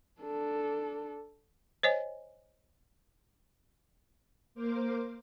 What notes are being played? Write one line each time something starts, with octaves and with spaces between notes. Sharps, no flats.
D4 A4
C5 C#5 D#5 G#5
A#3 A#4 C5 D6